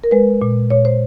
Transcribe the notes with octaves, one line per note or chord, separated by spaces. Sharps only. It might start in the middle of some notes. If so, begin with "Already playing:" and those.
A#4
G#3 B4
A#2
A#2 C#5
C5